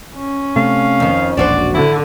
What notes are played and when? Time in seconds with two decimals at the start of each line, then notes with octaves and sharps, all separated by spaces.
0.15 C#4
0.56 C3 A3 F5
1.00 F2 D#3
1.37 E1 A#1 D4 F#4 C5 D5
1.74 D3 E4